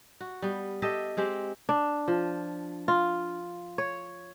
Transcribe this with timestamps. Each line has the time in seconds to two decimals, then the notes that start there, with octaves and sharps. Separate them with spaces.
0.20 F#4
0.42 G3 B3
0.82 G4 A4 D#5 E5
1.17 G#3 C4 G4
1.69 D4
2.08 F3
2.88 F4
3.78 C#5